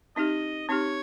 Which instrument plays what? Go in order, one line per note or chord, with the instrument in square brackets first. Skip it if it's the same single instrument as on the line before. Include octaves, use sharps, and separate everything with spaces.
[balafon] C4 D#4 G4 [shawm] D#5
[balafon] C4 D#4 G4 [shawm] C#5